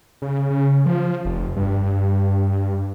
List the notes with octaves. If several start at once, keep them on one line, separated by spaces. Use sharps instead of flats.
C#3
C#3
F3
F1
G2